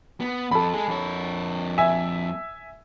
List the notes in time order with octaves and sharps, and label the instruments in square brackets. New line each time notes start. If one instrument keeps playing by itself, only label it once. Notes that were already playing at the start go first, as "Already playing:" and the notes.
[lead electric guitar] B3
[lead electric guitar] F2 [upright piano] A4 B5
[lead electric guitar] G#3 G#4
F2 C#5
[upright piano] E5 G#5